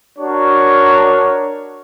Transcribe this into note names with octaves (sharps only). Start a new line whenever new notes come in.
D4 F#4 A#4 C#5